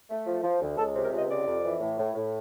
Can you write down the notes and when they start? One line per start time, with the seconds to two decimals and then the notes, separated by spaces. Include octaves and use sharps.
0.10 A3
0.27 F3
0.43 F3
0.61 D2
0.78 C#2 A4
0.95 C3
1.03 A#4
1.12 C#2 D#5
1.29 C3 D5
1.47 F2
1.64 E3
1.80 A2
1.98 A2
2.15 A2